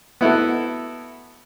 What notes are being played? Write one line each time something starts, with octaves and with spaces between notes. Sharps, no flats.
B3 E4 F#4 A4